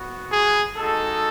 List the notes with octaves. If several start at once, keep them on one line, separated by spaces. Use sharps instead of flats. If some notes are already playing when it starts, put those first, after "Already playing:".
Already playing: B3 F#4
G#4
G#3 D#4 F#4 A4